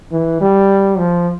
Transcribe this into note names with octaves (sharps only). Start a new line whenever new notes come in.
E3
G3
F3